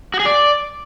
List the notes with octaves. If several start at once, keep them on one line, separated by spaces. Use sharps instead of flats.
F#4
G#4
D5